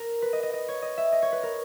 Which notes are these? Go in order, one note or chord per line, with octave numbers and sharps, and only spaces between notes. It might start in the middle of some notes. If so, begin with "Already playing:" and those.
Already playing: A#4
B4
D#5
D#5
D#5
C#5
D#5
E5
D#5
C#5
B4
A#4